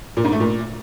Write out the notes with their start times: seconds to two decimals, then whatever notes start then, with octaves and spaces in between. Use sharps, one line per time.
0.17 A#2
0.24 G#2
0.32 A3
0.40 A#2